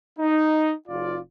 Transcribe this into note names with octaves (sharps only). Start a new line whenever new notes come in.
D#4
F#1 F4 D5